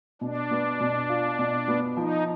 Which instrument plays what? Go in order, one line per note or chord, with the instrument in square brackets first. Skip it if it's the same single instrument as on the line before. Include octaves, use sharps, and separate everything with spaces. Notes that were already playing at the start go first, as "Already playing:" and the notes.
[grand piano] B2 [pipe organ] D4
[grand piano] B3
B2
F4
B2
B3
[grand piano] F3 [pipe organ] D#4